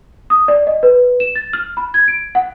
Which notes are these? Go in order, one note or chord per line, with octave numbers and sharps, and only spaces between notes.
D#6
D5
D#5
B4
E7
A6
F6
B5
G#6
D7
F#5